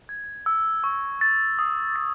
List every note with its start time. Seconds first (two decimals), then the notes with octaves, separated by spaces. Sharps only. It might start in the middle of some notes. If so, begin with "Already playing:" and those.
0.09 G#6
0.46 E6
0.84 C#6
1.21 A6
1.59 D#6
1.96 A6